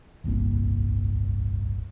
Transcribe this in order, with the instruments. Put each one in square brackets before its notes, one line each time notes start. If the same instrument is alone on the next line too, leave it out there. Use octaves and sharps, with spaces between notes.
[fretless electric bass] D1 G1 C2 A#3